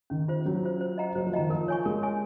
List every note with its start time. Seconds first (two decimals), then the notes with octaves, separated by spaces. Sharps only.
0.10 D#3 C#4
0.28 F4 C5
0.45 F#3 C#4
0.63 F4 C5
0.81 C5
0.98 D#5 F#5 A#5
1.15 F#3 C5
1.27 F3
1.33 D#3 D#5 F#5 A#5
1.50 F3 A#4
1.68 C#5 G#5 C#6
1.85 G#3 A#4
2.03 C#5 G#5 C#6